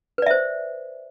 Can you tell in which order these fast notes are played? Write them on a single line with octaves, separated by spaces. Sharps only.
B4 D5 E5 C5